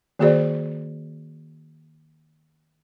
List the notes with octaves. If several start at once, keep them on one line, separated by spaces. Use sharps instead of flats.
D#3 A#3 F#4 G#4 C5 D5